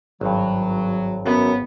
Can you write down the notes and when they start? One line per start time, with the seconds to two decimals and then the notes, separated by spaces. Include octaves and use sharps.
0.21 G#1 G2 F#3
1.25 F#2 B3